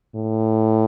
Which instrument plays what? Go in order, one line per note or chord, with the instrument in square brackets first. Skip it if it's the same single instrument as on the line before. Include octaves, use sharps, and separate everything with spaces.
[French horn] A2